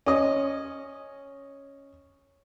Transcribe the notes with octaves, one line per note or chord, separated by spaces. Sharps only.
C#4 D#5